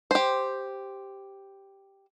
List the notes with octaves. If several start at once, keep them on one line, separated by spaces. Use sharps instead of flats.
G4 C5